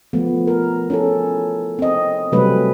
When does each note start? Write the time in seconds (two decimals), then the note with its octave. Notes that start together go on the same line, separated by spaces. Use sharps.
0.13 F3 A3 B3
0.47 A#4
0.90 C#4 E4 A4
1.79 C4 D#5
2.32 C3 F#3 G3 A3 C#4 B4